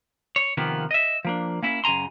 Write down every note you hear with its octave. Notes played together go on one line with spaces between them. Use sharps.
C#5
C3 D#3 F3 A#3 B3
D#5 E5
F3 A#3 D4
A#3 C#4 E4 E5
F#2 C#3 G#5 A#5 C6